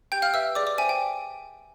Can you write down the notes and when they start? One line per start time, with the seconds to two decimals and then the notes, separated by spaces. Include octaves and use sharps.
0.12 G4 G5 G6
0.22 F5 F6
0.34 B4 E5 E6
0.55 G#4 D5 D6
0.67 D5 D6
0.78 C5 E5 G5 G#5
0.89 G5